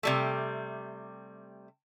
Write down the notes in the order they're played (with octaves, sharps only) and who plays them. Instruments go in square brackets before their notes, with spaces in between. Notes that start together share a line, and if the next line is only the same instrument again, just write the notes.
[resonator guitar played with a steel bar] C3 G3 A3